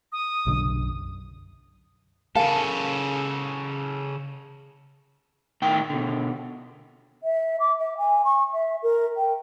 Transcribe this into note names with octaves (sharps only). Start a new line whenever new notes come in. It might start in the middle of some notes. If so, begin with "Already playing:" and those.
D#6
B1 F#2 D3
C#3 A4 A#4 F5 G#5 A5
A2 D#3 G5
B2 D3
E5
D6
E5
G#5
C#6
E5
A#4
G5